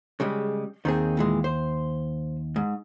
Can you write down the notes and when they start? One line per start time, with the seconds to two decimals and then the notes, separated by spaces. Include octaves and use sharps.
0.20 C#3 G3 G#3
0.85 D#2 D#3 C4 G#4
1.17 A#2 E3 G#3
1.44 C5
2.56 G#2